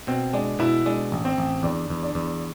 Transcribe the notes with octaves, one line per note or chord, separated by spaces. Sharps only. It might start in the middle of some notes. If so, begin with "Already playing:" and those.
B2 C4
G#3 D4
B2 E4
G#3 D4
A1
C4
A1
E2 D4
E2
D4
E2